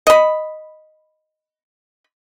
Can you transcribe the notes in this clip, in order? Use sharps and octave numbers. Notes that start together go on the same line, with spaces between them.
D#5 B5